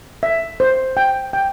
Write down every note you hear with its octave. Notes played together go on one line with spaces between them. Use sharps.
E5
C5
G5
G5